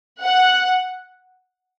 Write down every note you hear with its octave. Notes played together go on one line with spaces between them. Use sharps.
F#5